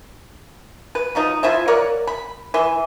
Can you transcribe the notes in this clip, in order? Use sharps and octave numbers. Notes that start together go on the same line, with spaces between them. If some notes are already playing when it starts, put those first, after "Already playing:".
B4
F3 F#3 D#4
F3 E4 C5 E5
A#4 C#5 D5 F#5
B5
E3 E5 C6